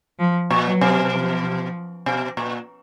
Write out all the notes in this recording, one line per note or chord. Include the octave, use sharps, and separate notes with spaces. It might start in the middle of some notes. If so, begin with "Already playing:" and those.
F3
A#2
F#3
B2
F3
B2
A#2